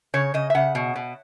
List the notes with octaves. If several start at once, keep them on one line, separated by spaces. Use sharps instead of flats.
C#3 C#5
C#3 D#5
E5
C#3 F#5
B2
B2